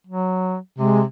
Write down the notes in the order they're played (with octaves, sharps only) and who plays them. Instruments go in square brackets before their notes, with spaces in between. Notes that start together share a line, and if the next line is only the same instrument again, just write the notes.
[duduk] F#3
[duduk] C3 [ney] G#3